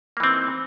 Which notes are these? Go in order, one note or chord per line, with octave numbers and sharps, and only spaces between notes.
E3 A#3 C4 D#4